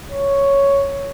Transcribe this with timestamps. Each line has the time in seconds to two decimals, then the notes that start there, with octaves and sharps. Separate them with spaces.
0.11 C#5